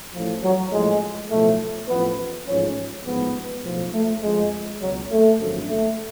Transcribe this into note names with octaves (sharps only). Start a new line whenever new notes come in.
A1 A2 F3
F#3
A1 A2 F3 G#3
B1 A2 F3 A3
A1 A2 F3 B3
A1 G#2 F3 C#4
A1 G#2 F3 B3
B1 A2 F3
A3
F2 F3 G#3
C#2 B2 F#3
A3
G#1 F#2 D3 F3
A3